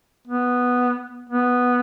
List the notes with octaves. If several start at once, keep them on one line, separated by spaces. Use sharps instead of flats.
B3
B3